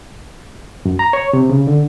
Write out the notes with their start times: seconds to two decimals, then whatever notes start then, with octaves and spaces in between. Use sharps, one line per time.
0.85 F#2
0.99 A#5
1.13 C#5
1.33 C3
1.50 C#3
1.67 D3